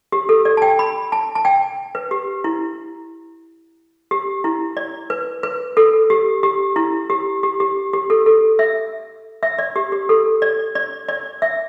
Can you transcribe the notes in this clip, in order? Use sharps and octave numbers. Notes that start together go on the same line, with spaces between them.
G4
A4
D5
A5
G5
B5
A5
A5
G5
B4
G4
E4
G4
E4
D5
B4
B4
A4
G4
G4
E4
G4
G4
G4
G4
A4
A4
E5
E5
D5
G4
G4
A4
D5
D5
D5
E5